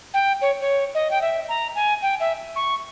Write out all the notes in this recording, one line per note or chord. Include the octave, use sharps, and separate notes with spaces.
G5
C#5
C#5
D#5
G5
E5
A#5
G#5
G5
E5
C#6